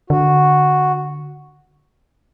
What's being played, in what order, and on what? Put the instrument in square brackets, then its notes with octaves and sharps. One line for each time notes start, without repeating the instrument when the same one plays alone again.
[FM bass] D3 [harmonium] F#4